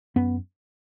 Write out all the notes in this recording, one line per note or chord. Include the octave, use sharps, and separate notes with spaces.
F#2 B3